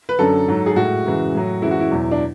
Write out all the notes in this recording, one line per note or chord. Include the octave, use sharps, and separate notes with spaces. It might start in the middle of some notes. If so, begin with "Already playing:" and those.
B4
F#2 D3 F#3 A4
G#2 F#3
G#4
A2 G#3 F#4
F#2 C#3 E3 G#3
A2 F#3
F#2 E3 G#3 E4
F#4
E4
E2 B2 F#3
D4